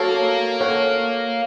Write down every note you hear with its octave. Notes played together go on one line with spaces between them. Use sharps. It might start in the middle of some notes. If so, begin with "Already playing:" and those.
Already playing: A#3 F#4 A4 C#5 A5
A4 C#5 F#5